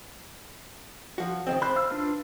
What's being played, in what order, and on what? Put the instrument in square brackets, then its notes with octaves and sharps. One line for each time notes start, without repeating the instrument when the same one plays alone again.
[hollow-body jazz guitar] F3 F#4
A2 D#3 C4
[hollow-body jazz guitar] C5 [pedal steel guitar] B5 F#6
[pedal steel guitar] F5 E6 F6
D4 F4 B4